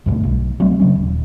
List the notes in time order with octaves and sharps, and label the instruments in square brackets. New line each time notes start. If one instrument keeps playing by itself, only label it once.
[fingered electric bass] C#2 G2 B2 A3
B1
F#3 G3 A3 C4
C#3 F#3 C#4
D#1